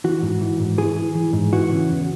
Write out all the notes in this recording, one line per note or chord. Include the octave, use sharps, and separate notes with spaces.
E3 F#4
G#2
E3
G#2
E3 G#4
E3
E3
G#2
E3 F#4
C#3
E2